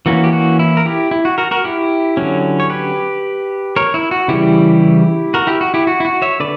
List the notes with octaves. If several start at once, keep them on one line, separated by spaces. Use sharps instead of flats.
E3 A#3 C#4 F#4
G4
F#4
E4
A#4
E4 G4
E4
F#4
F#4 A#4
F#4 A#4
E4 G4
D3 F#3 C#4
C#5
G4 B4
A#4 C#5
E4
F#4
C#3 E3 G3 E4 G4
F#4 A#4
E4 G4
F#4
E4 G4
F#4
E4
F#4
C#5 E5
D3 B4 D5